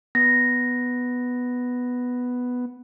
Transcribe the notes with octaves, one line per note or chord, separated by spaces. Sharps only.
B3 A#6